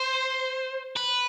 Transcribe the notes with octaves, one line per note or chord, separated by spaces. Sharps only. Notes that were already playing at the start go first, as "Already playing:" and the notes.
Already playing: C5
B4